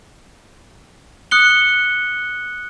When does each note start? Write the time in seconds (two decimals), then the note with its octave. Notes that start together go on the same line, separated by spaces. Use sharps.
1.31 D#6 F#6 C#7 G7